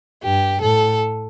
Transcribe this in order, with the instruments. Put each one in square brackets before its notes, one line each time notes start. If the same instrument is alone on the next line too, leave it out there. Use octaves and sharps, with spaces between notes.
[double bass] G2 [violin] G4
[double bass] A2 [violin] A4